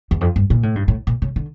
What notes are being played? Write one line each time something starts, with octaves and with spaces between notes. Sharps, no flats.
E2
F2
G2
A#2
A2
G2
A2
A#2
C#3
D3